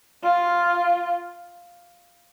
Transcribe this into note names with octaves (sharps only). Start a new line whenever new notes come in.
F4